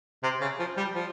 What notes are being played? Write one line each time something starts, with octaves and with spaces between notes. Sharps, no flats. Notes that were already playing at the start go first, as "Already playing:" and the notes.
C3
C#3
F3
G3
F3